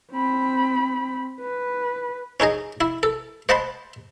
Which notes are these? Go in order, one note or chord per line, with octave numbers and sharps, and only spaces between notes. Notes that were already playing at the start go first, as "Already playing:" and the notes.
C4 B5
B4
C#4 D#4 G#4 D#5
E4
A4
C5 D#5 F#5 A5 B5 C6